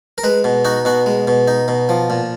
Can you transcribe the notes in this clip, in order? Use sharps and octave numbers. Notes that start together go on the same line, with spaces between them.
A#4
G#3 B4
B2
D#4 F#4
B2 F#4
G#3
B2
D#4
B2
F3
A#2